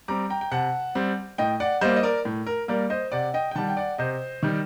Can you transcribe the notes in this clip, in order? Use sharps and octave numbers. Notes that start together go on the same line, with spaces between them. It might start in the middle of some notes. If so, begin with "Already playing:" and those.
G3 C4 A#5 D6
G5 A#5
G5
C3 F#5 A5
G3 C4
A2 D#5 G5
D5 F#5
G3 A#3 C5 D#5
D#5
A#4 D5
A2
A#4
G3 A#3 A#4 D5
C5 D#5
C3 D5 F#5
D#5 G5
G5
D#3 G3 F#5 A5
G5
D5 F#5
C3 C5 D#5
D#3 G3